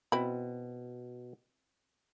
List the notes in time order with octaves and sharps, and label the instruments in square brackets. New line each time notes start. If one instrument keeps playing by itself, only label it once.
[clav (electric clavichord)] B2 [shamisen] C4 E4 B5